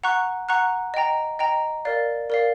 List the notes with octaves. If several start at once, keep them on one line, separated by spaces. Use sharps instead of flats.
F#5 A#5 C#6 F#6
F#5 A#5 C#6 F#6
D#5 G5 A#5
D#5 G5 A#5
A#4 D5 F5
A#4 D5 F5